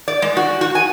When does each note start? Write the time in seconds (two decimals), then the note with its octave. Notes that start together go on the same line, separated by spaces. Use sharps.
0.08 D5
0.22 G#3
0.37 F#4
0.61 F#4
0.75 G#5